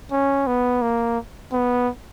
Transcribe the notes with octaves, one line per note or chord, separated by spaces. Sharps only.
C#4
B3
A#3
B3